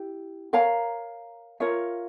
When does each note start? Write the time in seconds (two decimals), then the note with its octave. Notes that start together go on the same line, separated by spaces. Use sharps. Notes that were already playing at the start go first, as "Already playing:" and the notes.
Already playing: E4 G4
0.53 A#4 C#5 F5 A#5
1.60 F4 A#4 C#5 E5